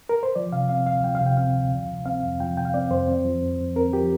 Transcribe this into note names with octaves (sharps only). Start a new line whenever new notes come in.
A#4
C5
F3 D5
C3 F5
C4 F5
D2 F5
F3 G5
F5
C3
G5
C4 F5
D2
F3
C3
C4 F5
F2
F3 G5
C3 G5
F5
C4 D5
F2 C5
C4
F3
F2
F2
C4 A#4
F3 G4